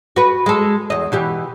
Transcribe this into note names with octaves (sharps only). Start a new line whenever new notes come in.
F#4 B4
G#3 A4
E2 D#5
B2 E3 G4